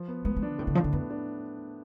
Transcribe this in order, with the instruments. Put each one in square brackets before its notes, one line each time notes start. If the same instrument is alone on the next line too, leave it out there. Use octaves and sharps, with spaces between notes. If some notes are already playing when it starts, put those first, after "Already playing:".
Already playing: [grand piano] F3
B3
[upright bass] G#3 [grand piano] B3
[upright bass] G#3
[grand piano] D4
[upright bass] D3
[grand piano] A2 [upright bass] C3
[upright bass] D3
[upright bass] F3 [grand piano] D4
[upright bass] D3
[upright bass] F2 [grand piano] B3
[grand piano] D4